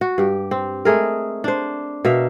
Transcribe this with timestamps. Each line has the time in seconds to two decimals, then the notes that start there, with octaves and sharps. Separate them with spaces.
0.01 F#4
0.18 G2 G4
0.51 C4
0.85 G#3 A3 G#4 A#4
1.44 D4 C5
2.05 B2 A#4 E5 F5